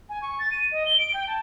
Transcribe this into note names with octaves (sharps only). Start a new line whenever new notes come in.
G#5
C#6
A6
D#7
D#5
G7
D7
G5
A5